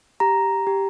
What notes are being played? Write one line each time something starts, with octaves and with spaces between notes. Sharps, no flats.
G4 A#5
G4